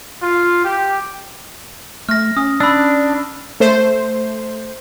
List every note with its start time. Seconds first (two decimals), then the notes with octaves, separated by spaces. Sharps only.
0.22 F4
0.64 G4
2.09 A3 F6 A#6
2.37 C#4 D#6
2.60 D4 B5 E6
3.60 A3 C5